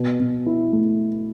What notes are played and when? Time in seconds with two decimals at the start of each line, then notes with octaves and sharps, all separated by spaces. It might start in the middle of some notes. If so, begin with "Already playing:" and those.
Already playing: B2
0.20 B2
0.46 E4
0.73 A3